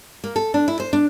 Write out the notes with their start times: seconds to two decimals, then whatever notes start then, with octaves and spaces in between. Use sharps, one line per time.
0.24 A#3
0.36 A4
0.54 D4
0.68 E4
0.80 C5
0.93 D4